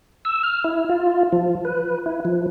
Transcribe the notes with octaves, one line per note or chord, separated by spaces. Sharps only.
E6
F6
E4
F4
F3
B4
E4
F3